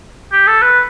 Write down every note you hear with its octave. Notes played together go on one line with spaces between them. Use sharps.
G4
A4
B4